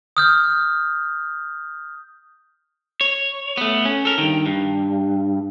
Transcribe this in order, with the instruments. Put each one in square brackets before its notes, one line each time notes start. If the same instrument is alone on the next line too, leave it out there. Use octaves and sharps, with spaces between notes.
[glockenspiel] D#6 F6 G6
[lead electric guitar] C#5
A3 B3
C#4
A4 A#4
G2 D#3
G2